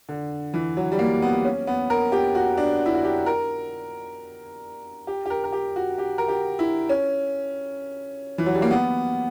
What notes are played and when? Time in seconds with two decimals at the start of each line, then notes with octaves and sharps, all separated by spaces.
0.09 D3
0.54 E3
0.77 F#3
0.92 G3
0.99 A#3
1.22 B3
1.45 C#4
1.67 B3
1.90 A#4
2.12 G4
2.35 F#4
2.57 D4
2.86 E4
2.94 F#4
3.04 G4
3.26 A#4
5.07 G4
5.26 G4
5.30 A#4
5.44 A#4
5.53 G4
5.76 F#4
5.98 G4
6.18 A#4
6.28 G4
6.59 E4
6.89 C#4
8.38 E3
8.46 F#3
8.55 G3
8.62 A#3
8.71 B3